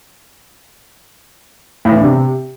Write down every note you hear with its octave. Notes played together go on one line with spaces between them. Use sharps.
A2
E3
D4
C3